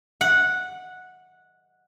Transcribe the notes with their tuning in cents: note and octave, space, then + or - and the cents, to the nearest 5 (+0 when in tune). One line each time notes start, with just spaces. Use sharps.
F#5 -10